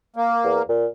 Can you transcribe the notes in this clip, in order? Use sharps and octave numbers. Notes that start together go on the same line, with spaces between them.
A#3
E2
A#2